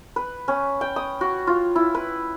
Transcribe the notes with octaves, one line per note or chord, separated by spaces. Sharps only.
B4
C#4
G5
D#6
F#4
F4
E4
B4